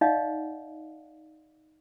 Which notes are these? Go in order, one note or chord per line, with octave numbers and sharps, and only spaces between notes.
D#4 D5 D#5 F5 F#5